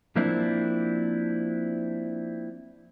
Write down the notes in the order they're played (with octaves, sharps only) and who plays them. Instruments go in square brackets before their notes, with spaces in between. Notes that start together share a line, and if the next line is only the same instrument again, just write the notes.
[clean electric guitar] F3 A#3 C4 D4 E4